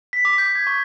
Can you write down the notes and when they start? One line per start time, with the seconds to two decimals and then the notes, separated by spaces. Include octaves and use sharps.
0.13 B6
0.25 D6
0.38 G6
0.55 G#6
0.67 C#6